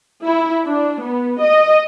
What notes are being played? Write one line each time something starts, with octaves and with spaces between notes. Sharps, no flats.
E4
D4
B3
D#5